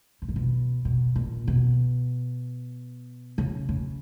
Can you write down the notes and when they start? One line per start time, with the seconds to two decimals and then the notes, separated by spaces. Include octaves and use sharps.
0.22 B2
0.29 A#2
0.36 B2
0.85 B2
1.16 A#2
1.48 B2
3.38 C#3
3.69 C#3